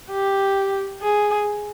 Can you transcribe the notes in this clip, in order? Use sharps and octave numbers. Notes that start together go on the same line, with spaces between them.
G4
G#4